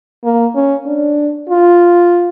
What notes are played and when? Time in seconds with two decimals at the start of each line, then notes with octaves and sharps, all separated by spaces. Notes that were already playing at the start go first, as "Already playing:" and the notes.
0.24 A#3
0.55 C#4
0.87 D4
1.49 F4